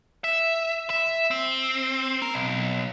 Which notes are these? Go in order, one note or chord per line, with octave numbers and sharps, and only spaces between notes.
E5
E5
C4
A#4
B1